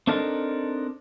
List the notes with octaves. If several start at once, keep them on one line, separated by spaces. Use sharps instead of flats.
C4 D4 D#4 A4 A#4